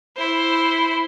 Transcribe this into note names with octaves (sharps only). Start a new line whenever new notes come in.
E4 C5